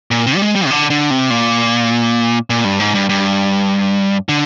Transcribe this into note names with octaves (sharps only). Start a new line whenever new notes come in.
A#2
C3
G3
G#3
G3
C3
D3
D3
C3
A#2
A#2
G2
G#2
G2
G2
D3